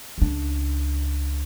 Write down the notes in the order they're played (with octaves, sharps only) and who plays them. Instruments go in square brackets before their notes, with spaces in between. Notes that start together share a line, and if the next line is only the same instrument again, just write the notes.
[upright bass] C#2 D4